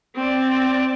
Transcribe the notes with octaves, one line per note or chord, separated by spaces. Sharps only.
C4 D5